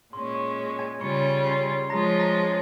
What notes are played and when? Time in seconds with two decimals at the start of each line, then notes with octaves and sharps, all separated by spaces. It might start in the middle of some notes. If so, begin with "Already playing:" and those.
0.13 A#2 G#3 C#4 C6
0.35 C#6
0.79 G#5 G#6
1.01 C#3 G3 C#4 F4 C#6 C#7
1.45 C6 C7
1.90 F3 G#3 C#4 F4 A#5 A#6
2.20 A#5 A#6